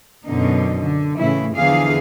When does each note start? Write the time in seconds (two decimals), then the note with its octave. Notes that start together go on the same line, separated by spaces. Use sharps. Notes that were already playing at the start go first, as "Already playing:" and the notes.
0.24 F#2 B2 D3 D#4
0.81 D3
1.17 A2 C#3 E3 A3 E4
1.55 E2 D3 E3 F3 G#4 F5